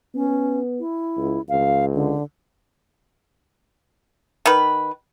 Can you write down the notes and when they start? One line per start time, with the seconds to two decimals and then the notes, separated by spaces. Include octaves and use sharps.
0.15 B3 C#4
0.80 E4
1.18 C#2
1.49 C#2 F5
1.95 D3
4.46 D#3 B4